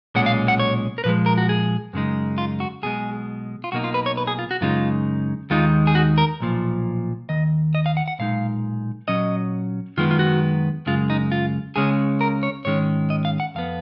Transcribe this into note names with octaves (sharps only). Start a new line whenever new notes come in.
B1 A#2 G#3 C#4 F#5
F5
F#5
C#5
A#4
A#2 F3 G#3 B4
A#4
F#4
G#4
F#2 C#3 G#3 D#4
F4
F#4
B1 B2 G#3 G#4
F4
B1 B2 A#3 D#4 F#4
F4
B4
C#5
B4
G#4
F4
F#4
F#2 C#3 G#3 D#4 F4
D#2 D#3 G#3 D#4 F4
G#4
F#4
A#4
B1 A#2 F3
D#2 D#3 D#5
D#5
F5
F#5
F#5
B1 A#2 G#3 D#4 F5
A#2 F#3 C#4 D#5
F#2 D#3 G#3 B3 F4
F4
F#4
F#2 C#3 G#3 F4
D#4
F4
C#2 C#3 G#3 C#4 G#4
A#4
C#5
G#2 D#3 G#3 C#4 C#5
D#5
F5
F#5
F2 F3 B3 F5